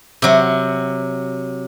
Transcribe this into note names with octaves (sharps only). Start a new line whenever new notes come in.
C3 F#3